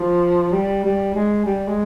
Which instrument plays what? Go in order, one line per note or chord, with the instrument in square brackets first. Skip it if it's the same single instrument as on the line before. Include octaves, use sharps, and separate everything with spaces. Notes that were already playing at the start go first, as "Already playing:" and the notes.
Already playing: [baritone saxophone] F3
G3
G3
G#3
G3
G#3